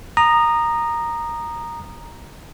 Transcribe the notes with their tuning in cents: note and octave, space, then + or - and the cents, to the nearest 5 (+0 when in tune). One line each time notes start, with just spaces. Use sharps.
A#5 +0 D#6 -20